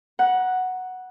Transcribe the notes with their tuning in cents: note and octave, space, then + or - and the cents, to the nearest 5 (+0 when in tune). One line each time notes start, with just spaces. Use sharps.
F#5 +0 A#5 +40